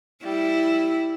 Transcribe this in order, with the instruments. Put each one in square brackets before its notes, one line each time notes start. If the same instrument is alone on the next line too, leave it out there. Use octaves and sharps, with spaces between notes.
[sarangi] G3 [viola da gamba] E4